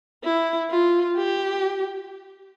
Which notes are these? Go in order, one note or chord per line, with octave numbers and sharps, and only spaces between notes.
E4
F4
G4